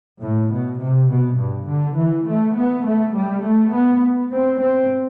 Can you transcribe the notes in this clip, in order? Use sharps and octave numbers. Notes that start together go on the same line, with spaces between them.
A2
B2
C3
B2
G2
D3
E3
A3
B3
A3
G3
A3
B3
C4
C4